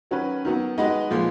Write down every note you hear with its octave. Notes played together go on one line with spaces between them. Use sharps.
D#3 F#3 C#4 F#4 B4
D#3 F#3 B3
G#3 D#4 F#4 B4 D#5
A#2 F3 G#3